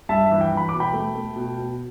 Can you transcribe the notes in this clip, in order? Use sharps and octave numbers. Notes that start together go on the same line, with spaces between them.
G2 E5 A5
E5
E3
G5
E3
B5
B2 D6
G5 B5
A3
A3
B2
B2